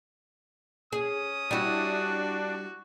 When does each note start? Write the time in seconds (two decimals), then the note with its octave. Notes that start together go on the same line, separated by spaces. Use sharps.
0.93 C#4 G#4 D#6
1.51 G3 D4 E4 F#4